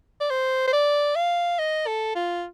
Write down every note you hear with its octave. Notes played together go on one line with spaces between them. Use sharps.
D5
C5
C5
D5
F5
D#5
A4
F4